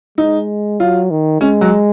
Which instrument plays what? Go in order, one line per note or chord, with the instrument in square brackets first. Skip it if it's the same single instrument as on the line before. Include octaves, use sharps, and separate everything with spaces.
[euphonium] G#3 [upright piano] D#4
[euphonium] F#3 [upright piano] F4
[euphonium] D#3
[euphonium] G#3 [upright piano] C#4
[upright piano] F#3